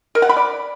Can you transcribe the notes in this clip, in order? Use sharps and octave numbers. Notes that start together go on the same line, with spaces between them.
A#4
F#5
B5
D5